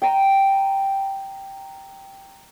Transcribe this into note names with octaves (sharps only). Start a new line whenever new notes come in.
G5 A#5